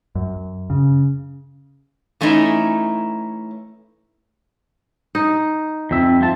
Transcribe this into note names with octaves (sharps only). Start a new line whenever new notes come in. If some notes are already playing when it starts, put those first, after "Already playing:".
F#2
C#3
E3 A3 C#4 D#4 E4
D#4
F2 C4 E5
G#2 F4 E5 A5